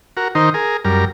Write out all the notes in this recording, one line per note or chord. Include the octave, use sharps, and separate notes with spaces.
F#4 A#4
D#3 D#4 A#4 C5
G#4 A#4
F#2 G3 A#4